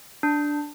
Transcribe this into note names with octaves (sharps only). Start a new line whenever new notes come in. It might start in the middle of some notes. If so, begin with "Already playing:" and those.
D4